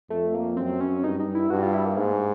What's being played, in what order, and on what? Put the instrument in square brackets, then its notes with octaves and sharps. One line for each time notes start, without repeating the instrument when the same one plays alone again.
[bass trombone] F2 [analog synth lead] A3
[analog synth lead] A#3
[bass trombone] F#2 [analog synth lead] C4
[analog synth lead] C#4
[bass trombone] G2 [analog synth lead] D#4
[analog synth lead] D#4
E4
[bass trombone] G2 [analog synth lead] F#4
[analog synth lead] F4
E4
A#3
[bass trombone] G#2 [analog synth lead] A#3
[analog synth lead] G#3